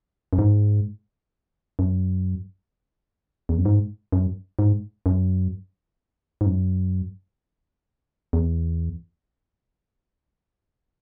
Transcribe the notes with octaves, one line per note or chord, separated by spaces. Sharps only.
F#2
G#2
F#2
E2
F#2
G#2
F#2
G#2
F#2
G#2
F#2
E2